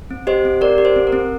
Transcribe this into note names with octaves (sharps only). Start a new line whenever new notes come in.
C4
G4 C5 D#5
C4
G4 A#4 D5
G4
C5
C4
A#4
C4